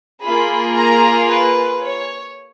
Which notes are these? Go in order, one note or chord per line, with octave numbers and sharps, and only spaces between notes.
A#3 F4 G#4 B5
A#5
B4
C#5